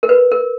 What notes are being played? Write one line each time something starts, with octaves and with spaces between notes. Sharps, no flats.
A#4
B4
A#4